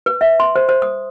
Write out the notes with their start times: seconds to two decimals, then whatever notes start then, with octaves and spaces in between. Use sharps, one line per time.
0.06 B4
0.21 E5
0.40 C6
0.56 C5
0.69 C5
0.82 D#6